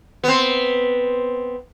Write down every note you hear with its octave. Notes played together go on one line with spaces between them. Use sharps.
B3 C4